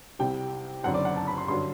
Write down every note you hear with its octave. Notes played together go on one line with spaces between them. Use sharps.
C2 C3 G3 G5
F#1 F#2 D3 F#3 C4 F#5
D5
F#5
A5
B5
C6
G2 D3 F#3 C6